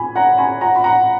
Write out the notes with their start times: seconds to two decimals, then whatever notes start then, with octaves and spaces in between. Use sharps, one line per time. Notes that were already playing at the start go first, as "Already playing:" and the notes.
Already playing: G#5 B5
0.16 F#5 A#5
0.38 G#5 B5
0.61 F#5 A#5
0.76 B5
0.84 F#5 A#5